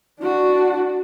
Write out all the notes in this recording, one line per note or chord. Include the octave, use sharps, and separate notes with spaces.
D4 F#4